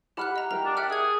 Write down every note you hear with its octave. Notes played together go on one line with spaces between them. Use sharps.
G4 E5 F#5 B5 F6 F#6
D#5 A#5
G4 A#4 A#5
D4
E5 F#5 G5 F6
G#4 E6 G#6